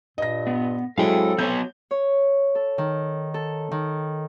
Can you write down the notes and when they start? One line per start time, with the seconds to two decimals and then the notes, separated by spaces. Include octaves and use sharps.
0.18 G2 A#2 D#5 A#6
0.47 B3
0.98 A2 F#3 G#3 C4 E4 A4 F5 G5
1.39 F#3 B3 C#5 G6
1.91 C#5
2.55 A4
2.78 D#3
3.34 A4
3.71 D#3